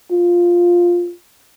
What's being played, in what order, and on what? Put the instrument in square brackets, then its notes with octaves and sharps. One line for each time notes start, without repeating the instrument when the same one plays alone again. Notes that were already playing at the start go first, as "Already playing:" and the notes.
[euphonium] F4